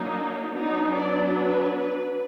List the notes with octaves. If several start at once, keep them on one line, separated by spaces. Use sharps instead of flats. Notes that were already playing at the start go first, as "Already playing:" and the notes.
Already playing: F#3 A#3 D4 D#4
F#3 B3 D4 D#4
D5
B4
B4